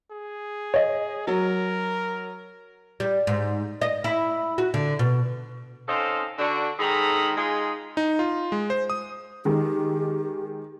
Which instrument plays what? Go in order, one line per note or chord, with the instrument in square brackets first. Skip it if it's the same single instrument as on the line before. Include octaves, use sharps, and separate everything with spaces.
[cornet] G#4
[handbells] C#5 D#5
[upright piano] F#3 [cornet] A#4
[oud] G3
G#2
D#5
E4
F#4
D3
B2
[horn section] C4 C#4 D#4 A4 C5 F5
D3 D4 F#4
G#2 D#3 G#4 A4 A#5 B5
G#3 D#4 F4 G#4
[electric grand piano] D#4
F4
G#3
C5
D#6
[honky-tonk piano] D#3 G#3 [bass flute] G4